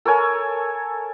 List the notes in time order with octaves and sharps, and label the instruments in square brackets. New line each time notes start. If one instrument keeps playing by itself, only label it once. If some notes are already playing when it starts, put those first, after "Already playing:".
[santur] A4 A#4 C#5 G#5